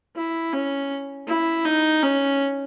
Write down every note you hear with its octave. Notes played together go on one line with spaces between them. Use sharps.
E4
C#4
E4
D#4
C#4